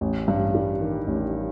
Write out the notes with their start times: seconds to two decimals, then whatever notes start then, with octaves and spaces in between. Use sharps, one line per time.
0.01 A1
0.28 G2
0.55 G3
0.81 D#3
1.07 A1